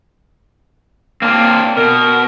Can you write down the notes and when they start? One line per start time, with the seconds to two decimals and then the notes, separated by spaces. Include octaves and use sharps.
1.22 A#3 C4 D4
1.77 B2 A#4